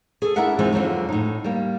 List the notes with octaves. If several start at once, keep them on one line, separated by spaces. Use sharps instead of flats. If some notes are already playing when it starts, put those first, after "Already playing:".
G#4 A4
D4 E4 G#4 A#4 E5 F#5
E3 F3 G#3 C4 D#4 F#4
F2 D3 F3 F#3 A3
A2 D#4
G3 A#3